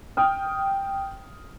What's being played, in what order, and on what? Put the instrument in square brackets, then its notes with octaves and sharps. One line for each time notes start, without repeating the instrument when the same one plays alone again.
[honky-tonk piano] G5 D#6 F6